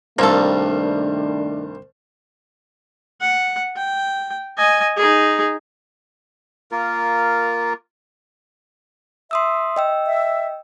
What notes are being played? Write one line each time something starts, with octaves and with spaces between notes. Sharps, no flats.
C2 G2 D#3 A3 A#3 D4 A4 C5
F#5
G5
D#5 G#5
D#4 G#4
A#3 F4 A#4
E5 C6 D#6 E6
D#5 G5 E6
E5